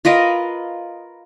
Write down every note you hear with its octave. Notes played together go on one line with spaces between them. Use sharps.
F4 A#4 B4 D#5